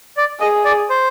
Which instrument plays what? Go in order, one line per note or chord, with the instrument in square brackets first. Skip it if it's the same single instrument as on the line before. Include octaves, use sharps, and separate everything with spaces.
[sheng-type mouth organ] D5
[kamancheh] G#4 [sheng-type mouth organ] D#5
[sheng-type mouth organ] D5
C5